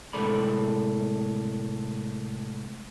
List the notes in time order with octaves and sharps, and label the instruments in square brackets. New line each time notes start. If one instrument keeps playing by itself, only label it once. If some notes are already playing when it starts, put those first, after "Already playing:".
[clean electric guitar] A2 C3 G#3 A4 D5 B5